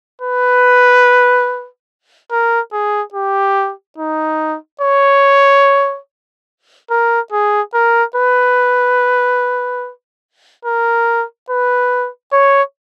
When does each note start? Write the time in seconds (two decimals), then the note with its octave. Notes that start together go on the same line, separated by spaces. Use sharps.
0.22 B4
2.31 A#4
2.73 G#4
3.14 G4
3.98 D#4
4.81 C#5
6.91 A#4
7.32 G#4
7.74 A#4
8.16 B4
10.65 A#4
11.50 B4
12.33 C#5